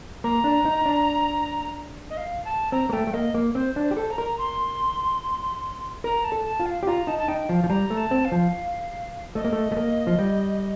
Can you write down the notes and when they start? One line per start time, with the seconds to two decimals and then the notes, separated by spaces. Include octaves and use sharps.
0.24 A#3 A#5
0.44 D4
0.65 D#4
0.86 D4
2.10 D#5
2.17 F5
2.45 A5
2.72 C4 A#5
2.89 A#3
2.93 A3 G5
3.07 A3
3.14 A#3 D#5
3.34 A#3
3.55 C4 C5
3.76 D4
3.83 C5
3.91 G4
3.97 A4
4.11 A#5
4.18 A#4
4.38 C6
6.04 A#4 A#5
6.24 A5
6.32 A4
6.45 A5
6.60 F4
6.66 F5
6.83 G4
6.87 F4 A#5
7.07 D#4 A5
7.18 A5
7.28 D#4 G5
7.49 F3 F5
7.64 F3
7.70 G3 A#5
7.90 A3
7.97 A5
8.11 C4
8.25 F5
8.32 F3
9.35 A3 D#5
9.44 A#3
9.53 A3
9.72 A3
9.77 A#3
10.07 F3
10.19 G3